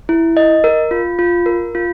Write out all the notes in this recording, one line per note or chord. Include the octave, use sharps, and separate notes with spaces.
E4
D#5
A#4
F4
F4
A#4
F4